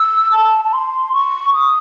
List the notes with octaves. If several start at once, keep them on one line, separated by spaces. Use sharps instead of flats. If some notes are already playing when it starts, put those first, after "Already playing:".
Already playing: E6
A5
A5
C6
C#6
D#6